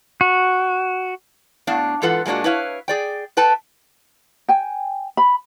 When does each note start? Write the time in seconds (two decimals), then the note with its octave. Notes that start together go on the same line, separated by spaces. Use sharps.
0.21 F#4
1.67 A2 B3 D4 F5
2.02 G#2 E3 F4 A4 B4 F#5
2.26 A#2 G#3 A#3 D4 F#4
2.44 E4 B4 C#5 F5
2.88 G#4 D5 G5
3.37 A4 B4 G5 A5
4.49 G5 G#5
5.17 B5